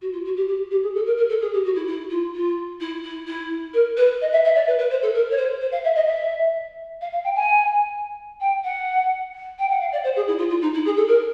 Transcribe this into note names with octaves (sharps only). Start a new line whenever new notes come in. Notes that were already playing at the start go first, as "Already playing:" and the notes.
F#4
F4
F#4
G4
G4
G4
G#4
A4
A#4
A#4
A4
G#4
G4
F#4
E4
E4
F4
F4
E4
E4
E4
A#4
B4
D#5
E5
E5
D5
B4
B4
C5
A4
A#4
C#5
C5
C5
F5
E5
D#5
E5
F5
F5
G5
G#5
G5
F#5
G5
F#5
F5
D5
C5
G#4
E4
F4
F4
D#4
E4
G#4
A4
A#4